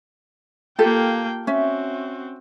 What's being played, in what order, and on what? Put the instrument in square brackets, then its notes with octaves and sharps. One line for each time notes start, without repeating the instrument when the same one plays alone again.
[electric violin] A#3 G5 [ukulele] F4 G4 A4
[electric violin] C4 F#4 [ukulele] C#4 E5